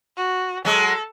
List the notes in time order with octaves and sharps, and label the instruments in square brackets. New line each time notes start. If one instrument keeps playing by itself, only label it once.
[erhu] F#4
[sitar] F#3 G#3 [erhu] A4